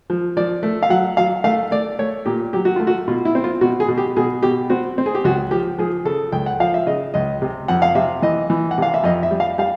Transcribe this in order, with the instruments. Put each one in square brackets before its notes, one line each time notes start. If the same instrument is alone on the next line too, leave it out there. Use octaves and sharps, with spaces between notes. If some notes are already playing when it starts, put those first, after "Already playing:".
[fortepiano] F3
F3 D5
A3
F5
F#3 F#5
F#3 F5
A3 F5
A3 D5
A3 C#5
A#2 G4
F#3 G4
F#4
A3 F4
F#4
B2 F4
E4
C4
F4
B2 F#4
G#4
B2
G4
B2 G#4
B2 G4
C4 F#4
C4
G#4
G4
C#2 F#4
F3 G4
F3 G#4
C#3 A4
C#2 G5
F#5
F3 F5
E5
C#3 D#5
C#2 D#5
C3
F2 F#5
F5
C3 E5
E3 D#5
E3
F#5
C3 F5
E5
F2 D#5
E5
G3
F5
G3 F5